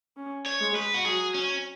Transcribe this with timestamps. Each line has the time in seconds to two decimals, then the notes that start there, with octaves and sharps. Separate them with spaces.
0.17 C#4
0.46 C#5
0.60 G#3
0.75 B4
0.94 F#4
1.05 F#3 G#4
1.34 C#4